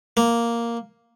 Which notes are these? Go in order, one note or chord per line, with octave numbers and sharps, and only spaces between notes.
A#3